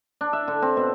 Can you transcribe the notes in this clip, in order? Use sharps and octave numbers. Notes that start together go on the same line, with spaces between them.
D4
E5
D3
C4
B2